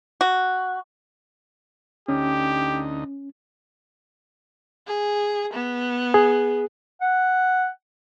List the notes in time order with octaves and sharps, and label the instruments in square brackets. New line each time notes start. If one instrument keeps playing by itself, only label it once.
[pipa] F#4
[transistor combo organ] D2 D#4 [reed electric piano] C#4 [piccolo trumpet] G4
[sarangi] G#4
B3
[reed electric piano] G#4
[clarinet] F#5